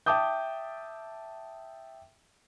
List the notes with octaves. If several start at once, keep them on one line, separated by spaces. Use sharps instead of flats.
E5 G5 A5 D6 D#6 G6